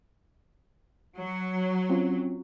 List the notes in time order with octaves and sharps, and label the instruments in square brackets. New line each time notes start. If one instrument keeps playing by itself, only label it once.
[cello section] F#3
[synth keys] C4 C#4 F4